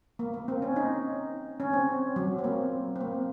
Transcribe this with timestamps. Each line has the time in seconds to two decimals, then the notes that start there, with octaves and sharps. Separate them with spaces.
0.19 A#3
0.34 A#3
0.48 C4
0.62 C#4
0.76 D#4
1.60 C#4
1.73 C4
2.16 F#3
2.38 C4
2.44 A#3
2.96 C4
3.01 A#3